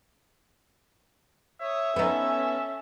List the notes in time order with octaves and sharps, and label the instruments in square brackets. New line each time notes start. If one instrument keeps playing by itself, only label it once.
[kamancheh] C#5 D#6 [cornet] E5
[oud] B3 D#4 [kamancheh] C#4 A4